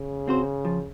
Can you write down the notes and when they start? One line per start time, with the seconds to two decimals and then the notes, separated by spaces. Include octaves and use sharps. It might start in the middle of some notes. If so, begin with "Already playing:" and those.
Already playing: C#3
0.28 C4 F#4 C5
0.65 F3